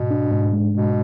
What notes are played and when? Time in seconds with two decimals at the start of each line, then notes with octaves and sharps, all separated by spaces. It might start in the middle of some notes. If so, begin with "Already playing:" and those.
Already playing: G#2 B2
0.11 D4
0.31 G#2
0.53 G#3
0.74 G#2 B2